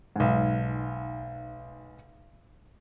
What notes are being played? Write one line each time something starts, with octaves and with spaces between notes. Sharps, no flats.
B1 G#2